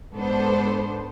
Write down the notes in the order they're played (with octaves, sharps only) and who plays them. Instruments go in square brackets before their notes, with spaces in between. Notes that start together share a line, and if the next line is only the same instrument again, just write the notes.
[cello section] G#2 D4 [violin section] B3 A4 C5